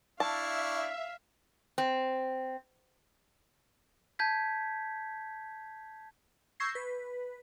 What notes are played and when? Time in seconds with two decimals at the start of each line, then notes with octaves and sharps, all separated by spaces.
0.20 D4 E4 E5 F5 A5 C#6
1.78 C4
4.19 A5 G6 G#6 B6
6.60 C#6 E6 G6 G#6 A#6 C7
6.75 B4